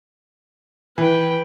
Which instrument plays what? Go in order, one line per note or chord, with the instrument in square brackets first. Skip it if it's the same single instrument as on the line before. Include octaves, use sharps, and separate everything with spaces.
[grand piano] E3 [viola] B4 G5